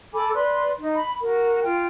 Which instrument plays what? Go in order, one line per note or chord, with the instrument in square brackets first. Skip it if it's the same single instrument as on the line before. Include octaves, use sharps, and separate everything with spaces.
[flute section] A4 G#5 B5 D6
B4 D5 C6
D#4
B5
F#4 A#4
F4 G5